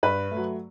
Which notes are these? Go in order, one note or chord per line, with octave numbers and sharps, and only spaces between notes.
G2 B4
A3
F#3